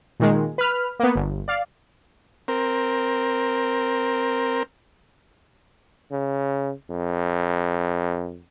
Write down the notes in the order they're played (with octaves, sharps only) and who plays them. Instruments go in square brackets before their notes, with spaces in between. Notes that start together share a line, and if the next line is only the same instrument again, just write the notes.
[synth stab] A#2 D#3 G#3
B4 B5 F6
A#3 B3
G1
D5 F5
[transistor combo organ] C4 A#4
[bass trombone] C#3
F2